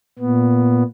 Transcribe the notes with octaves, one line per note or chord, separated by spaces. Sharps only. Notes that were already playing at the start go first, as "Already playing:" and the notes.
A#2 B3